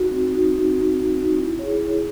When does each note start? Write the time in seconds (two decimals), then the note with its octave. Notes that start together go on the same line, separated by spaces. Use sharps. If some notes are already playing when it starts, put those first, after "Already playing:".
Already playing: D#4 F#4
0.11 C4
0.32 D#4 F#4
0.54 C4
0.75 D#4 F#4
0.95 C4
1.16 D#4 F#4
1.38 E4
1.59 G#4 C#5
1.81 E4